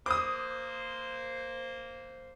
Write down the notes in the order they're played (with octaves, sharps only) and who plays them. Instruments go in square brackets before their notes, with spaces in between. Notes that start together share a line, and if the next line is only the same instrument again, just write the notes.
[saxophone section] A#3 C5 [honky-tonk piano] D6 D#6